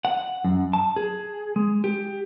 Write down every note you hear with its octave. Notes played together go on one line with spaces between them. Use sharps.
F#5
F#2
A5
G#4
G#3
G4